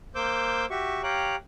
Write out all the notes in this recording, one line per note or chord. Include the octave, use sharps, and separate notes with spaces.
A#3 C5 D6 E6 G6
F#4 G4 E5 C#6
G4 C#5 F5 G5 A#5 F#6